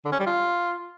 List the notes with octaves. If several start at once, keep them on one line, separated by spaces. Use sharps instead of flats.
D3
C#4
G3
F4